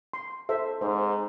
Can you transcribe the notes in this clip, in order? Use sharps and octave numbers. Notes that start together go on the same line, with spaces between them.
C6
A4 C5 E5
G#2 C5